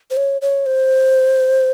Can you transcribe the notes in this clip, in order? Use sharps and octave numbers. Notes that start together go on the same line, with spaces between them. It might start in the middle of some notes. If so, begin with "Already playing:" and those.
C5
C#5
C#5
C5